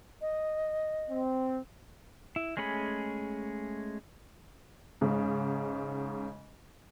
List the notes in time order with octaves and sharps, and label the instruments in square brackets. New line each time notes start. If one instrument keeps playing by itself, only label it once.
[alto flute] D#5
[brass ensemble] C4
[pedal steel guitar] E4
G#3 A3 C#4 G#4 B5
[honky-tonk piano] G#2 C#3